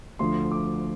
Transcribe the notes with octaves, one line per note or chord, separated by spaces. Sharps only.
D2 D3 F3 A3 C6
D6